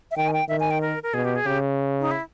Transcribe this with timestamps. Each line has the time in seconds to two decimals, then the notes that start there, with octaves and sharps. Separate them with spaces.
0.11 E5
0.16 D#3 G5
0.28 G#5
0.33 G5
0.49 D#3 E5
0.60 G#5
0.71 G5
0.81 A#4
1.03 A#4
1.14 B2 G#4
1.25 G4
1.36 G#4
1.46 C#3 G4
2.00 D#4
2.11 E4